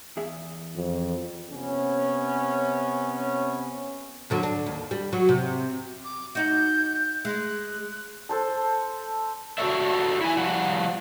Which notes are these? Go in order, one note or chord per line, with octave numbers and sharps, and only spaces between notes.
E2 G#4 E5
F2
C3 B3 C#4
D#2 D3 F#3
D4
D#2
G3
F#3
C3
D6
D#4 F#4 G6
G#3 F#6
A4 C5 A5
F#4 G4 A4 C#5 D5 E5
E4 G#5
F3 G3 F#5